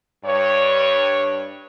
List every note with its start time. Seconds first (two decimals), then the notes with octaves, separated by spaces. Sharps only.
0.25 G2 C#5